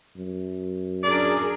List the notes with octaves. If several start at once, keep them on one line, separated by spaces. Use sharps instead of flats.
F#2
D4 G#4 A#4 D5